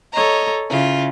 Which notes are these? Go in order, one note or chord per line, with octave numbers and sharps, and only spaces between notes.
A4 C#5 D#5 A#5
C#3 E4 F4